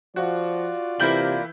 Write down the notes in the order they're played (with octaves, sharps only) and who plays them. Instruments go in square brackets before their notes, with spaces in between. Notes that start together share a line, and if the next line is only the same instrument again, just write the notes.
[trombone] F3 [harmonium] F4 D5 [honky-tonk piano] F#4
[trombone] C3 [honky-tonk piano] E3 G6 F#7 [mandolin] A#3 E4 G5